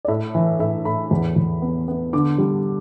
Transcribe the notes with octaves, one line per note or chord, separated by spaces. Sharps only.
D5
A2 E5
E3
A2 E5
A2 B5
E2
E2
B3
B3
D3 D6
G3